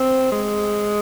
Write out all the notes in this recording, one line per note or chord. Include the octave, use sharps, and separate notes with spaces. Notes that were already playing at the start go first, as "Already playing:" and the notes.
Already playing: C4
G#3